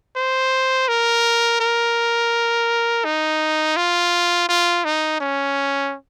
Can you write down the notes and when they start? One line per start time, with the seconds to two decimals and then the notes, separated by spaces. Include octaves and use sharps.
0.16 C5
0.88 A#4
1.60 A#4
3.05 D#4
3.76 F4
4.49 F4
4.85 D#4
5.20 C#4